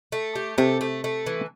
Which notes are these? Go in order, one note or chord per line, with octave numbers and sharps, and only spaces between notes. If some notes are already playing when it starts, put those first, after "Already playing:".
A3
G4
C3 A3
A3
A3
E3